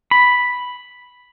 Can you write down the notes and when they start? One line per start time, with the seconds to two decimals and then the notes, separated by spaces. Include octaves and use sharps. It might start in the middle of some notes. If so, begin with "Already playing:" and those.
0.11 B5